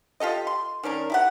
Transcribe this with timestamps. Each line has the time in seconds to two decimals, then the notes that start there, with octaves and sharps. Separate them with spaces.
0.20 F4 G4 A4 D#5
0.47 C6
0.83 D#3 C#4 D4 A#4
1.10 E4 G4 F#5